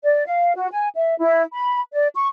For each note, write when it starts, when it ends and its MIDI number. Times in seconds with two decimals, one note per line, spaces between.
0.04 0.23 74
0.26 0.52 77
0.55 0.68 66
0.72 0.88 80
0.95 1.14 76
1.20 1.43 64
1.53 1.81 83
1.93 2.08 74
2.15 2.27 85